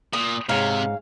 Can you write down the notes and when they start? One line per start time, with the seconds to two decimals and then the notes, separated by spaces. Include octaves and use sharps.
0.13 A#2 D#6
0.49 G#2 C3 C#5 F5